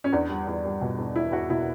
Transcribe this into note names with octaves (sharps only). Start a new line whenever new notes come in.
C#4
E2 D4
G3
E2
G3
B2
E2
E2 E4
E2 F#4
B2 E4